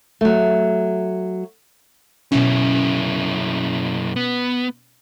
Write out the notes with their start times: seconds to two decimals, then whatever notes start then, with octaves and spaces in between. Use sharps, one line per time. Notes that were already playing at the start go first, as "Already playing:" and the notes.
0.21 F#3 A3
2.32 F#2 B2 C#4 E4
4.16 B3